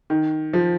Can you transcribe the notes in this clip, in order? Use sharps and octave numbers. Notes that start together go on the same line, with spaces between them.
D#3
F3